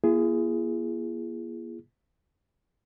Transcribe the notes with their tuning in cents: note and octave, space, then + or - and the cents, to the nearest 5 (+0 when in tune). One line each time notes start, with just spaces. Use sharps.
A#3 +35 E4 +45 G#4 +0